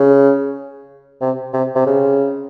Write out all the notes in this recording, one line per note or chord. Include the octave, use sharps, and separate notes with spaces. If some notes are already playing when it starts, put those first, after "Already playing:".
Already playing: C#3
C3
C3
C3
C#3